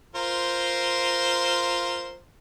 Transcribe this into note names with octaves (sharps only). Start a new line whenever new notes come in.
F4 A#4 C5